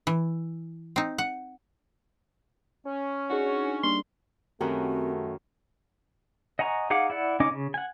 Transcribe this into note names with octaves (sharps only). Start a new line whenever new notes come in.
E3
C4 D#4
F#5
C#4
D4 D#4 F#4 G#4
G3 A#3 D4 C6
F#2 D#3 A3 C4 F#4 G4 A#4
D#5 F#5 G#5 A#5 C#6
D#4 G#4 F5 F#5 D6
E4 D5 F#5
C#3 C#4 D#4 D#5 D6
C#3
F#5 G#5